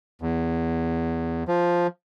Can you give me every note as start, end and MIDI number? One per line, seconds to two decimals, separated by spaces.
0.22 1.43 40
1.48 1.87 53